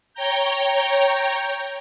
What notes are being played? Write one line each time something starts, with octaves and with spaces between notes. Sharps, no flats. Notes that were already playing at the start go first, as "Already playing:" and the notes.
C#5 G5 A#5 G6